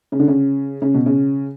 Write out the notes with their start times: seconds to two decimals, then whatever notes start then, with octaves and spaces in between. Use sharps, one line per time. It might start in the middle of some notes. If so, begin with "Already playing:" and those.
0.12 C#3
0.19 D3
0.28 C#3
0.82 C#3
0.94 B2
1.06 C#3